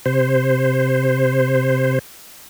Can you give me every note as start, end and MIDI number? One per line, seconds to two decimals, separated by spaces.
0.06 1.99 48
0.06 1.99 72